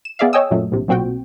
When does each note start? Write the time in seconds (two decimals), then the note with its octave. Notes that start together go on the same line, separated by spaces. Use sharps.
0.05 E7
0.19 B3 G#4 D5 E5 F5
0.33 C#5 D#5 G5 G#5 D#6 E6
0.51 F#2 A#2 F#3 A3
0.72 A#1 A2 C3
0.88 B1 A#2 C4 F#4 G5